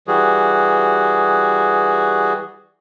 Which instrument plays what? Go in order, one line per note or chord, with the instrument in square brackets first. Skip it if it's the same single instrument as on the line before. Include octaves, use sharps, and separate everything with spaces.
[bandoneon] E3 G3 F#4 G#4